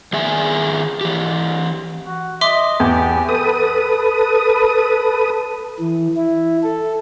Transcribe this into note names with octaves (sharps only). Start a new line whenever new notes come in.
D#3 G#4 E5 G#5
E3 G4
F#4
D#5 E5 C6 D6
E2 G4
A4 B4 D#6
E3
E4
A4